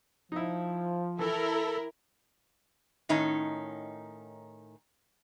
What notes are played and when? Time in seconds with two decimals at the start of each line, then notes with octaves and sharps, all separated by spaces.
0.32 F3 D#4 E4
1.19 E3 E4 A4 A#4
3.09 A2 D#3 C#4 D#4